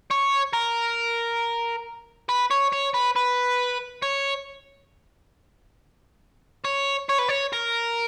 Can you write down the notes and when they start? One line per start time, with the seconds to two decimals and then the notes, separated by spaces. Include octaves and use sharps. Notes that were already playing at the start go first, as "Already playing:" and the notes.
0.11 C#5
0.53 A#4
2.29 B4
2.51 C#5
2.73 C#5
2.94 B4
3.16 B4
4.02 C#5
6.65 C#5
7.09 C#5
7.18 B4
7.29 C#5
7.53 A#4